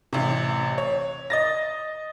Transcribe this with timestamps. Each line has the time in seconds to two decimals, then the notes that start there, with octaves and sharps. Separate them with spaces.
0.13 A1 C3
0.78 C#5
1.30 D#5 A6 A#6